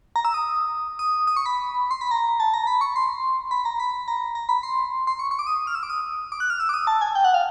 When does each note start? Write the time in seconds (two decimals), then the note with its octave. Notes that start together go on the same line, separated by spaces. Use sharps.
0.16 A#5
0.25 E6
0.34 D#6
0.99 D#6
1.27 D#6
1.37 C#6
1.46 B5
1.91 C6
2.01 B5
2.11 A#5
2.40 A5
2.54 A#5
2.67 B5
2.81 C#6
2.96 C6
3.51 B5
3.65 A#5
3.80 B5
4.08 A#5
4.35 A#5
4.49 B5
4.63 C6
5.07 C6
5.19 C#6
5.31 C#6
5.39 D6
5.47 D#6
5.67 F6
5.75 E6
5.83 D6
5.90 D#6
6.32 D6
6.40 F#6
6.50 F6
6.60 E6
6.69 D6
6.74 D#6
6.87 A5
7.01 G#5
7.15 G5
7.24 F#5
7.34 F5